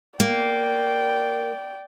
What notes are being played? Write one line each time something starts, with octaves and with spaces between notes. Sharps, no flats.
A#3 D5 G5